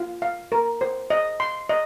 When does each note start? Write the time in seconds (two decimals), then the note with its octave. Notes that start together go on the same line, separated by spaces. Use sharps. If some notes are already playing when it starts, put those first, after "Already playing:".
Already playing: F4
0.22 F5
0.52 A#4
0.81 C5
1.10 D#5
1.40 C6
1.69 D#5